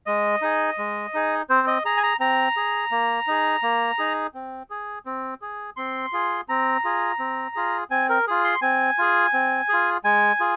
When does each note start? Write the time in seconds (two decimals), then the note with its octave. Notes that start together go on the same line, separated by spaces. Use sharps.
0.06 G#3 D#5
0.42 D#4 G#4
0.78 G#3
1.14 D#4 G#4
1.49 C4 C5
1.67 D#5
1.85 G#4 A#5
1.97 G#5
2.03 A#5
2.20 C4 A#5
2.57 G#4
2.91 A#3
3.27 D#4 G#4
3.63 A#3
3.98 D#4 G#4
4.34 C4
4.70 G#4
5.06 C4
5.42 G#4
5.77 C4 C6
6.13 F4 G#4
6.49 C4 A#5
6.84 F4 G#4
7.19 C4
7.56 F4 G#4
7.90 C4 G#5
8.09 A#4
8.27 F4 G#4
8.44 C6
8.62 C4 G#5
8.98 F4 G#4
9.33 C4
9.69 F4 G#4
10.04 G#3 G#5
10.40 F4 G#4